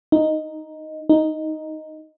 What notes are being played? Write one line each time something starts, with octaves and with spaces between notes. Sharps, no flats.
D#4
D#4